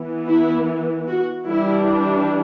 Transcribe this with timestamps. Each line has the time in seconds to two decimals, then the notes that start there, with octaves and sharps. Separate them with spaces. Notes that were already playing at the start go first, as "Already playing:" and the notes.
Already playing: E3 B3
0.28 E4
1.07 F#4
1.46 E3 G3 D4 E4